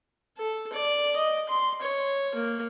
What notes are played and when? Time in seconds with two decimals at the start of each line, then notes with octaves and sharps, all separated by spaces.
0.38 A4
0.73 D5
1.16 D#5
1.49 C6
1.82 C#5
2.35 A#3